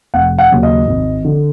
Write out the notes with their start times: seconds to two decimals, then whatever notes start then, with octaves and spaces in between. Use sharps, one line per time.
0.14 F1 F#5
0.38 F#5
0.50 D#2 C#3 F#3
0.63 D#5
0.87 G#1
1.25 D3